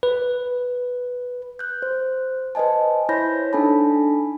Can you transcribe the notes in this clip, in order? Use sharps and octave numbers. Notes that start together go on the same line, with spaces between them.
B4
F#6 G6
C5
B4 C5 D#5 G#5 A5
E4 C5 C#5 B5 G6 A#6
D4 D#4 A4 G#5 A5 B5